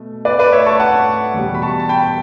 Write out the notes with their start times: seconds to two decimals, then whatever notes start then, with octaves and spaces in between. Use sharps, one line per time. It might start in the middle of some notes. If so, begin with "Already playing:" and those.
Already playing: B2 A3
0.25 B4 D5
0.39 B4 D5
0.52 C#5 E5
0.66 A5 C#6
0.80 F#5 A5
1.34 E2 B2 G3
1.55 B5
1.62 A5 C#6
1.80 A5
1.89 G5 B5